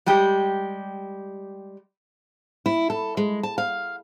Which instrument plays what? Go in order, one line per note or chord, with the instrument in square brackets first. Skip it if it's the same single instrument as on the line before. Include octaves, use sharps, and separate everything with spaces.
[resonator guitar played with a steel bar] G3 G#3 G4
[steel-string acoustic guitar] E4
A4
G#3
A5
F5